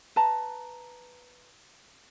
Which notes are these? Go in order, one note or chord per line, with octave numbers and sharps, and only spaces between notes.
B4 A5 A#5